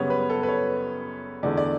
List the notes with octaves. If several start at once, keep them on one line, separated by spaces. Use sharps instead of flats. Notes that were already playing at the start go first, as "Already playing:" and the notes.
Already playing: F#2 C#3 G3 B3 C#5
B4
A4
B4
C#5
E2 D3 A3 D5
D5